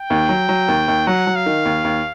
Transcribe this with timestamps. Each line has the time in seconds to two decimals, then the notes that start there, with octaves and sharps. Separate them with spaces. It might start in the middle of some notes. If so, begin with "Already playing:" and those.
Already playing: G5
0.10 D#2
0.29 F#3
0.49 F#3
0.68 D#2
0.88 D#2
1.07 F#3 F#5
1.27 F#3
1.36 F5
1.46 D#3
1.65 D#2
1.84 D#2